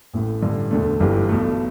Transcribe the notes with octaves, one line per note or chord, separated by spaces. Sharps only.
A1 A2 A3
A1 G2 D3
E1 D2 D3 A3
G1 G2 E3 G3
B1 B2 A3